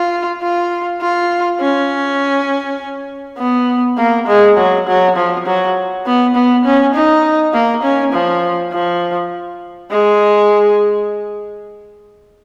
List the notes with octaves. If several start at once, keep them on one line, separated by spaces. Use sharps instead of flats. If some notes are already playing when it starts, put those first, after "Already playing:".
Already playing: F4
F4
F4
C#4
B3
A#3
G#3
F#3
F#3
F3
F#3
B3
B3
C#4
D#4
A#3
C#4
F3
F3
G#3